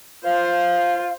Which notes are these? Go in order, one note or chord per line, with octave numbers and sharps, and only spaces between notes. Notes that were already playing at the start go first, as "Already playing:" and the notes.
F4 C5 F5